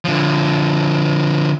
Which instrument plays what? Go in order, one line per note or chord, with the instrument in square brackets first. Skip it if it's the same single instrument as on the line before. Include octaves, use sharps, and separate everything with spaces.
[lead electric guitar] D3 F3